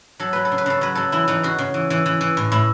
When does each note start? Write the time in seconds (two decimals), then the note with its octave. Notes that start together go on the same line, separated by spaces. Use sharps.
0.20 F#3 A4
0.33 F#3 B4
0.45 A4
0.52 C#3
0.58 B4
0.66 C#3 A4
0.81 F#3 B4
0.95 F#3 A4
1.12 E3 E4
1.28 E3 D#4
1.43 C#3 F#4
1.59 C#3
1.74 E3
1.90 E3
2.06 E3
2.21 E3
2.37 A2
2.52 A2 E4